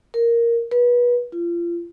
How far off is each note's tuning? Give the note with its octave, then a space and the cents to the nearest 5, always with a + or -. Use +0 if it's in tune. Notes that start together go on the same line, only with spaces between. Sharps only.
A#4 +0
B4 -30
F4 -30